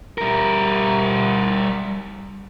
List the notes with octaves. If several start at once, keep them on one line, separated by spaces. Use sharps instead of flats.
G3 A#4